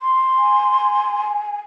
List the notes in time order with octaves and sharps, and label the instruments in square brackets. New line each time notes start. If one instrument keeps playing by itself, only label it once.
[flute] C6
[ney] G#5